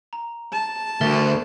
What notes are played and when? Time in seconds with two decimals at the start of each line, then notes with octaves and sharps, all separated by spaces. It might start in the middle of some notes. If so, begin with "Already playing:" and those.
0.13 A#5
0.53 A5 E7
1.01 D2 A#4 E5 A6